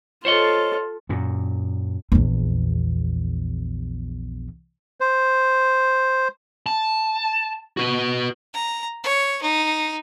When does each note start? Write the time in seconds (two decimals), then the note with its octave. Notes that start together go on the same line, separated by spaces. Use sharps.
0.25 F4 A4 C5 C#5 D#5
1.09 F#2 A#2
2.12 A#1 E2
5.00 C5
6.66 A5
7.77 F#4 B4
8.53 A#5
9.04 C#5
9.42 D#4